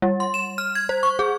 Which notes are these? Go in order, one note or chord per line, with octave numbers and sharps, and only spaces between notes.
G3
C6
E7
F6
G#6
C5
C#6
G#4